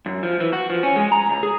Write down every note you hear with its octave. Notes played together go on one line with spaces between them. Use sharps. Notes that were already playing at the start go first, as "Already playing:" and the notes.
F#2
F3
E3
F#4
F3
C#4
G#3
A#5
C#2
G#4